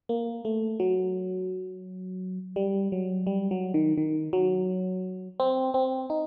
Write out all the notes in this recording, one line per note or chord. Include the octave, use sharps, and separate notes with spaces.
A#3
A3
F#3
G3
F#3
G3
F#3
D#3
D#3
F#3
C4
C4
D#4